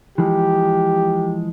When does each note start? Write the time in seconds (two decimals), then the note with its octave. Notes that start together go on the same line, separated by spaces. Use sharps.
0.18 E3 F3 G#3 G4